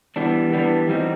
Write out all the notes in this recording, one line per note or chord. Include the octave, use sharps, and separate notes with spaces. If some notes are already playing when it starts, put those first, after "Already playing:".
E3 G3 B3 D4
E3 G3 B3 D4
E3 G3 C4 D#4 F#4